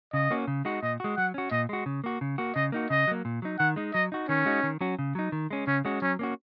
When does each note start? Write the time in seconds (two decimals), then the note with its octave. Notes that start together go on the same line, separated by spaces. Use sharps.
0.13 C#3 D#5
0.30 A#3 C#4 F#4
0.47 C#3
0.65 G#3 D#4 F#4
0.83 A#2 D#5
1.00 G#3 F#4
1.17 F#3 F#5
1.34 C#4 F#4
1.51 A#2 D#5
1.69 G#3 F#4
1.86 C#3
2.04 A#3 F#4
2.21 C#3
2.38 A#3 F#4
2.55 C#3 D#5
2.72 A#3 D#4 F#4
2.90 C#3 D#5
3.08 F#3 A#3
3.25 A#2
3.42 F#3 D#4
3.59 D#3 F#5
3.76 G#3 D#4
3.94 F#3 D#5
4.12 D#4 F#4
4.29 D#3 C#4
4.46 G#3 D#4 F#4
4.63 D#3
4.81 F#3 C#4 F#4
4.99 C#3
5.15 F#3 D#4
5.32 D#3
5.51 G#3 C#4
5.67 C#3 C#4
5.85 G#3 C#4 F#4
6.02 F#3 C#4
6.19 A#3 C#4 F#4